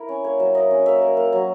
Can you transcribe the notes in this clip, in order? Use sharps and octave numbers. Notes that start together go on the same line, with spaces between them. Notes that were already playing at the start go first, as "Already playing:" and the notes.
Already playing: E4 A#4
C#4
A#3 C#5
F#3 E5
A#3 D#5
C#4
A#3 E5
A#3
A#3
F#3